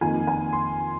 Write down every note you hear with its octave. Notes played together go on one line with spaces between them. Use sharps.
F2 D#3 A#3 F4 G#5
G#5
C6